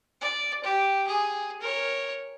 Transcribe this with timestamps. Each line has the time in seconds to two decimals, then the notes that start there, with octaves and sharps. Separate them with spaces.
0.21 D5
0.64 G4
1.07 G#4
1.61 A#4 C#5